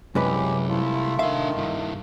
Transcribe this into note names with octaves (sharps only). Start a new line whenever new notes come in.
C2 F#2 E3 G#3 C#4 G4 B4
A3 E4 F4
D#3 D4 E5 F5
G2 E4